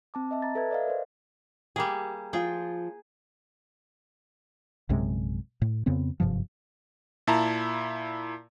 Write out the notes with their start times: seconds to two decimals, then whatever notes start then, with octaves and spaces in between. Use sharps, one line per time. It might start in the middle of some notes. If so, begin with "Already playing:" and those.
0.14 C4 A5 D6
0.31 D#5 E5 A5
0.42 A#5 A6
0.55 A4 B4 E5 G#6
0.71 D5 D#5 F5
0.88 A#4 C5
1.76 G3 A#3 G4 G#4
2.33 F3 F4 G#4 G5
4.89 A#1 F#2 C3 G#3
5.62 A2
5.86 F2 C#3 B3 C4
6.20 F#1 G2 C3 F3
7.27 A#2 E4 A5 A#5